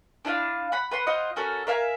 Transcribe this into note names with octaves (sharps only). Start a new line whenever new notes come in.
D4 E4 F4 F5
F#5 B5
B4 F#5 C6
F4 C5 D#5 F#5
C#4 F#4 A4 A#4
A#4 E5 F5 G#5